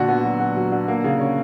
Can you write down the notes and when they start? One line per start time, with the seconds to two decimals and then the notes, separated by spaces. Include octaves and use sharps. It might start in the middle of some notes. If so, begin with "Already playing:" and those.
Already playing: A#2 D3 F#4
0.09 B3
0.24 F#3
0.40 B3
0.56 F#3
0.72 D3
0.88 A#3
1.04 C#3
1.20 C#4